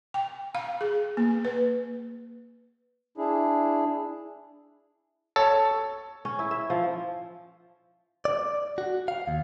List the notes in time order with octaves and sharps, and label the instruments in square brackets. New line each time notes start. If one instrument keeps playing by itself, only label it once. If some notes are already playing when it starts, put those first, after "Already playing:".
[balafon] G5
F5
G#4
A#3
B4
[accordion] D4 E4 G#4
[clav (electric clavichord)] A4 [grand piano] C#5
[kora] C#4
E4
E5
F3
[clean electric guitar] D5
F#4
F5
D#2